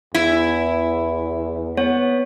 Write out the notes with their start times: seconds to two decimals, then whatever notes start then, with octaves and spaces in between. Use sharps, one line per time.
0.14 E2 E4
1.77 B3 C#5